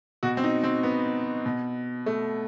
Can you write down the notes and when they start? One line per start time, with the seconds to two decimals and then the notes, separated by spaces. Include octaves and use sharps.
0.23 B2 F#4
0.37 C4
0.44 D#4
0.64 C4
0.83 B3
1.46 B2
2.06 A3